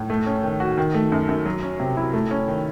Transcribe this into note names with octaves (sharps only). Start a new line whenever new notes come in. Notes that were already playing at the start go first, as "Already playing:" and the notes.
Already playing: A2
A3
C#4
D#3
F#4
D#3
A3
F#2
F#2
F#3
C#4
C3
E4
A3
C#4
D#3